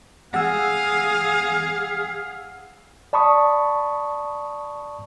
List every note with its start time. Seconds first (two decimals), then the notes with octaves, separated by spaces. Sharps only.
0.34 G#4 F5 F#5 E6
3.13 D5 A5 B5 C#6 D#6